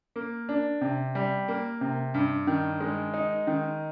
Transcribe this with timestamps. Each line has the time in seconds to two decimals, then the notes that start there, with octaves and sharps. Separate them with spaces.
0.16 A#3
0.49 D4
0.81 C3
1.15 G3
1.48 A#3
1.81 C3
2.14 G2
2.47 D#3
2.80 G#3
3.14 D#4
3.47 D#3